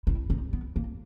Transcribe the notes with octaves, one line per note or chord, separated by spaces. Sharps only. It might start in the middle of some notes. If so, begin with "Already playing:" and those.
E4
D#4
B3
A#3